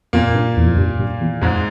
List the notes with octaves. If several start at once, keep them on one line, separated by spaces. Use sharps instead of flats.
F2 A#2 A#3
G2
E2
F2
G2
G2
E2
F2 G#2 G#3